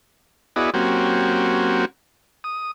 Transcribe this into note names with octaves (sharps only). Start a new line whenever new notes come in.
B3 E4 F#4 G#4 D5 D#5
F#3 A#3 C4 C#4 F#4 G4
D#6